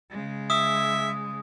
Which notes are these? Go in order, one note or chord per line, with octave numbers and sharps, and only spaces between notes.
C#3 G#3
E5 D#6